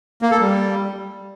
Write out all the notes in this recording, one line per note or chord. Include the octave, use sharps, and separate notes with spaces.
A#3
A4
G3